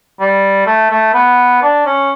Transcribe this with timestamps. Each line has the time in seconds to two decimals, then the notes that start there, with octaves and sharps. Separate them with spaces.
0.20 G3
0.66 A3
0.90 A3
1.14 B3
1.62 D4
1.86 C#4